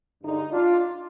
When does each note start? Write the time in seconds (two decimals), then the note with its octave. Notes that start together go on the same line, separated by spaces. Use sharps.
0.23 G2 D3 G#3 D#4
0.51 D4 F4